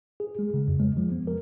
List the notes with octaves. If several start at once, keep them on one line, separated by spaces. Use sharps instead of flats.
G#4
G#3
C#3
F2
G#3
F3
B3
A#4